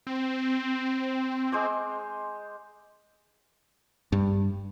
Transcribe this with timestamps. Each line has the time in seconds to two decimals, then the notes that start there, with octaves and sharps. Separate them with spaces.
0.07 C4
1.52 G#3 C5 D6
4.12 G2